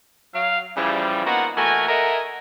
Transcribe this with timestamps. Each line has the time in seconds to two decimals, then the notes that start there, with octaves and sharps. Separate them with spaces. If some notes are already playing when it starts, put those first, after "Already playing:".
0.35 F#3 F5
0.77 C#3 E3 F3 G3
1.25 A#3 B3 D#4 F4 F#4
1.57 E3 A3 F#4 A#4 G#5
1.89 A4 A#4 D#5 E5 F#5 G#5